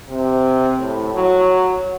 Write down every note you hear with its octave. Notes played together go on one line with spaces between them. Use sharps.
C3
A2
F#3